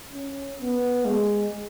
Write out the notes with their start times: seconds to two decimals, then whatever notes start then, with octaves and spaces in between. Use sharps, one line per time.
0.13 C#4
0.60 B3
1.05 G#3